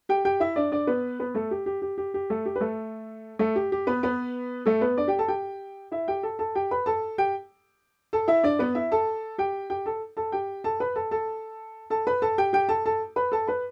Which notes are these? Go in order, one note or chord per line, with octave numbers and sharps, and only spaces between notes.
G4 G5
G4 G5
E4 E5
D4 D5
D4 D5
B3 B4
B3 B4
A3 A4
G4
G4
G4
G4
G4
A3 A4
G4
B4
A3 A4
A3 A4
G4
G4
B3 B4
B3 B4
A3 A4
B3 B4
D4 D5
G4 G5
A4 A5
G4 G5
E4 E5
G4 G5
A4 A5
A4 A5
G4 G5
B4 B5
A4 A5
G4 G5
A4 A5
E4 E5
D4 D5
B3 B4
E4 E5
A4 A5
G4 G5
G4 G5
A4 A5
A4 A5
G4 G5
A4 A5
B4 B5
A4 A5
A4 A5
A4 A5
B4 B5
A4 A5
G4 G5
G4 G5
A4 A5
A4 A5
B4 B5
A4 A5
B4 B5